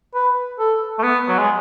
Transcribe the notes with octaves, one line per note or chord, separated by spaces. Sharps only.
B4
A4
A3
B3
F#3
G#3